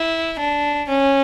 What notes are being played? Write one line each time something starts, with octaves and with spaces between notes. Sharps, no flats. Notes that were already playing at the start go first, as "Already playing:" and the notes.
Already playing: E4
D4
C#4